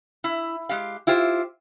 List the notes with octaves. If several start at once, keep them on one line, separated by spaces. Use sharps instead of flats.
E4
G#3 G4 F5
E4 F4 G4 C5